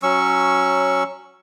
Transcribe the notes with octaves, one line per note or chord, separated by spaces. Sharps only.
F#3 C#4 C#6 E6